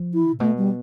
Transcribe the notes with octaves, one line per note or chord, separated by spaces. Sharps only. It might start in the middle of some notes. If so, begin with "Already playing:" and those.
Already playing: F3
E4
A2
B2 A3
G3